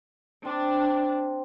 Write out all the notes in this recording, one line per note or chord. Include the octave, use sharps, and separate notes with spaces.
C4 D4